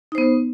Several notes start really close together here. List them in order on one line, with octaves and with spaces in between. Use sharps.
D#4 C5 B3